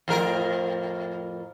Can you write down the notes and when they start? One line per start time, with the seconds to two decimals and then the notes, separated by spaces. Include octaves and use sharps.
0.08 F2 A2 A#4